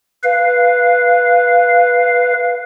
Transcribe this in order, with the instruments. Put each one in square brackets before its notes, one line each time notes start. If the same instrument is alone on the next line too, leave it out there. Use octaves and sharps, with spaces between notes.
[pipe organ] B4 F5